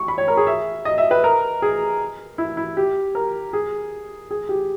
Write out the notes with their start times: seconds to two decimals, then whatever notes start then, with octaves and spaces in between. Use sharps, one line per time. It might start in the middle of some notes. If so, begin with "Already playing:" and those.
Already playing: C#6
0.08 B5
0.18 C#5
0.28 A#4
0.37 G#4
0.47 E5
0.85 D#5
0.98 E5
1.11 B4
1.24 A#4
1.62 G#4
2.38 E4
2.57 E4
2.77 G4
3.15 A#4
3.53 G#4
4.31 G#4
4.49 G4